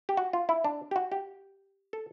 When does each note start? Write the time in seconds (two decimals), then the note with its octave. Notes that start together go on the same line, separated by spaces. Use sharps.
0.09 G4
0.17 F#4
0.33 F4
0.49 E4
0.64 D4
0.91 G4
0.96 F#4
1.12 G4
1.93 A4